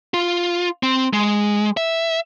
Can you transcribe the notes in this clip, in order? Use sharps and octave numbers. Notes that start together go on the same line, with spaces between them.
F4
C4
G#3
E5